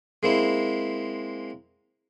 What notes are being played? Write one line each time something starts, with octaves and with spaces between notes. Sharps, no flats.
G#3 A#3 C4 E4